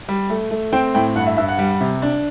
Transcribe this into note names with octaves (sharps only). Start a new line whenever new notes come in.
G3
A3
A3
C4 G5
A2 G5
G2 F#5
E5
G2 E5
F#5
G3
C3
D4